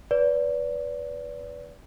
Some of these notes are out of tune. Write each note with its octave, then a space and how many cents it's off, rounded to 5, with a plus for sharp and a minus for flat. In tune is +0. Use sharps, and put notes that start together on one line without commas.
B4 -5 D5 -30